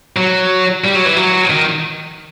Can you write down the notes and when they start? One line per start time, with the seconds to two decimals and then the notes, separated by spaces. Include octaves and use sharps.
0.16 F#3
0.84 G3
0.95 F#3
1.05 E3
1.16 F#3
1.50 D#3